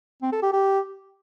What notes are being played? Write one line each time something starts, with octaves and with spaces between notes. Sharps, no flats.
C4
A4
G4
G4